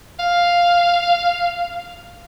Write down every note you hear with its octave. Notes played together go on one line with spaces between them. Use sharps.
F5